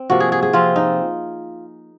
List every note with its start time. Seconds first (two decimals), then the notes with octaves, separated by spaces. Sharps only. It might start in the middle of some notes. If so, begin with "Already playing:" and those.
Already playing: C4
0.10 C3 F3 A#3 F#4
0.20 G#4
0.32 G#4
0.43 G#4
0.53 C3 F3 C4 F4
0.76 D#4